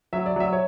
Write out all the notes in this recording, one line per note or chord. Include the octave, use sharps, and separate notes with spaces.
F#3 E5
D5
F#3 E5
C#5